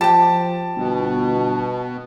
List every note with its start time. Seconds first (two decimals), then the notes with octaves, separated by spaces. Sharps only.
0.01 F3 G4 G5 A5
0.76 G1 B2